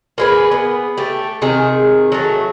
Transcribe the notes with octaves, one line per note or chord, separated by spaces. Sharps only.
A#3 G#4 B4
B3
A3 G4
C3 D#3 G#4
F#3 A3